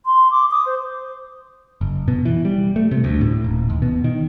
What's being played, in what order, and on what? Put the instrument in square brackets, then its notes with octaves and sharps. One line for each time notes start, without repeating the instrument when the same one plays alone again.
[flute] C6
D6
D#6
C5
[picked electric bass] F#1
B2
E3
G3
A3
C3
D2
A2
D#1
D#2
B2
D#3